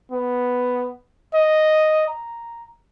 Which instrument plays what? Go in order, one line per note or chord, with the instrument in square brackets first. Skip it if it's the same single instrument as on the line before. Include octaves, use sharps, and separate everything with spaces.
[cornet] B3
D#5
A#5